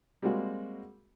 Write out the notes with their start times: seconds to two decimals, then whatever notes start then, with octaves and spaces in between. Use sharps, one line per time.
0.22 G3 G#3 A#3 C4 F#4